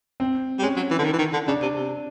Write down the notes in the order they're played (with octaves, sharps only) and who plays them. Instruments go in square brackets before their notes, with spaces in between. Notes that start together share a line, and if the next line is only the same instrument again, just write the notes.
[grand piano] C4
[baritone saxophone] G3
[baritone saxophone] G#3 [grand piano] C#4
[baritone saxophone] F#3
E3
D3
D#3
E3
D#3
D3
[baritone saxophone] C#3 [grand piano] D4
[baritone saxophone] C3
C3